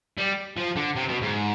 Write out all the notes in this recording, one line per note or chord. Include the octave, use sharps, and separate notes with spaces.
G3
F3
D3
C3
B2
G#2